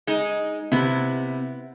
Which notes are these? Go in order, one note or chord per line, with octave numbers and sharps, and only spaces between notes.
G#3 D#4
C3 B3 E4